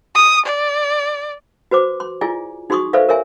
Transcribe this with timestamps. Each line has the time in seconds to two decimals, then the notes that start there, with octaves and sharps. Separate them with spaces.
0.15 D#6
0.46 D5
1.71 F#4 B4 C5 D6
2.00 C6
2.21 E4 F4 G#4 D5 G#5
2.70 D#4 F#4 G#4 C6 C#6 D#6
2.93 A4 B4 C5 D5 E5 F5
3.09 A#4 C#5 E5 G#5